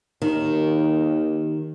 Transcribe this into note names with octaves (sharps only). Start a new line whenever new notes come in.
D#2 D#3